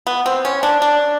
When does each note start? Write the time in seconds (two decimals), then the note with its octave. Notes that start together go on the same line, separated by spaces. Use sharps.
0.07 B3
0.26 C4
0.45 C#4
0.63 D4
0.82 D4